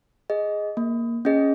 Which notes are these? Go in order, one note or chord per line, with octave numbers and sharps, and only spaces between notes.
G#4 D#5
A#3
C#4 G#4 D#5